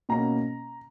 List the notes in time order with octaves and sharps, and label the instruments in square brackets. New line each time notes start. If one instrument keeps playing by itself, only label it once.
[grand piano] B2 A#3 C#4 A#5